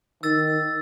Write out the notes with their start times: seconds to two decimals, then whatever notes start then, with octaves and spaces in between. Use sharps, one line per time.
0.23 D#3 E6 A6